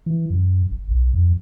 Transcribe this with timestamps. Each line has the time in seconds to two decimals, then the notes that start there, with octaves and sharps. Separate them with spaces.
0.06 E3
0.30 F#2
0.71 G1
0.91 B1
1.14 F2